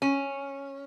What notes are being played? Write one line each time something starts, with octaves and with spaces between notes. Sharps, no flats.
C#4